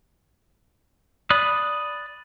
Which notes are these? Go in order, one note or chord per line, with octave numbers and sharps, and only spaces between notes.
D5 B5 D#6 F#6